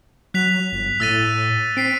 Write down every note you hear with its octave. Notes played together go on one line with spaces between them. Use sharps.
F#3 F#6 B6 F7
G1
A2 E6 A6 D#7
C4 B6 C7 D7